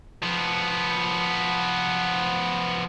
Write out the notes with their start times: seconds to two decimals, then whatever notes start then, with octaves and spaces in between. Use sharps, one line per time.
0.22 F3 B3